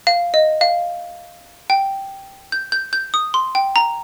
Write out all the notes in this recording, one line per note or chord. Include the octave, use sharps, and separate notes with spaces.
F5
D#5
F5
G5
G6
G6
G6
D#6
C6
G5
A#5